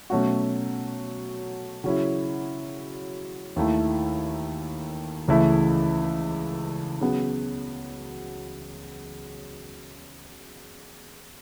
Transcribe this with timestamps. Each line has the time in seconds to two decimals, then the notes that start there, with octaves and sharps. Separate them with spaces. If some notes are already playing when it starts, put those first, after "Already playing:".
0.10 B2 F#3 A3 C#4 F#4
1.84 C#3 F#3 C#4 E4
3.56 D#2 D#3 A3 E4
5.28 C#2 C#3 E3 A3 E4
7.01 C#3 F#3 B3